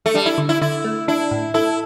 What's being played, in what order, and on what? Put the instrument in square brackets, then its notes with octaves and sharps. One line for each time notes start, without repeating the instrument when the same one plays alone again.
[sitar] A3
[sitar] G3 [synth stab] D4
[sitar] E4
[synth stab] D3
[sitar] E4
[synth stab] D3 [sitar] E4
[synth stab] A3
[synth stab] D4 [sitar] E4
[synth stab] A2
[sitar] E4 [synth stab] A4